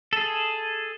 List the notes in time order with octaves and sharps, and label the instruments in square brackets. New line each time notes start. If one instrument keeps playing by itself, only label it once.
[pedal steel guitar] G#4 A4